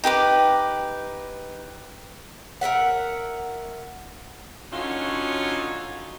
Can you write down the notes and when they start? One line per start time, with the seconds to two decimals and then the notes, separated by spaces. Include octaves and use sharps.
0.04 D#4 G4 B4 D6
2.61 A#4 B4 E5 F#5
4.71 D3 C#4 D#4 F4 F#4 C#5